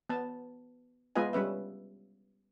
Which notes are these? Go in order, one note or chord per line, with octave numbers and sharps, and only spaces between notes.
B3 A5
G#3 B3 F4 B4 D#5 G#5
G3 C#4 B4 E5